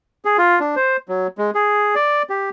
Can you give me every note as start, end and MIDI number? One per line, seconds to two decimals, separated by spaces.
0.25 0.37 68
0.38 0.59 65
0.60 0.75 62
0.76 0.97 72
1.09 1.27 54
1.38 1.51 56
1.55 1.95 68
1.95 2.23 74
2.29 2.50 67